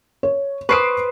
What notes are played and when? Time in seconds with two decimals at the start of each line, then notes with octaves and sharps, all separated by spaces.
0.23 C#5
0.69 B4 C5 C#6 D#6 C7 D7